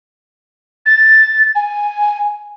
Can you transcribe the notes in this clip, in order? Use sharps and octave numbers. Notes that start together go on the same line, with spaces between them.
A6
G#5